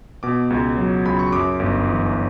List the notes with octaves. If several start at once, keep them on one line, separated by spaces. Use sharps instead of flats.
B2 D6
C#2
F#3
C#2 B5
C#6
F#2 D6
G1
E3